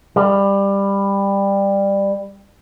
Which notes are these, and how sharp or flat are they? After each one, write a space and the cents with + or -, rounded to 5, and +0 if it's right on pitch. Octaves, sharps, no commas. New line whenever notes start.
G3 +15